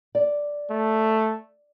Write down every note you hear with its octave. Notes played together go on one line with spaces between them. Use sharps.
D5
A3